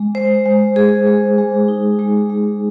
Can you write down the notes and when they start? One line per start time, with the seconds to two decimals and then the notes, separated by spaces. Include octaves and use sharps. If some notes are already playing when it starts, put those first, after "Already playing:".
Already playing: G#3
0.15 G#3 C5
0.46 G#3
0.76 G#3 G#4
1.07 G#3
1.38 G#3
1.68 D#4
1.99 G#3
2.30 G#3